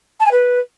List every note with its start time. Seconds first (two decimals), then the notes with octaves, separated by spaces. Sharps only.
0.20 A5
0.25 G#5
0.31 B4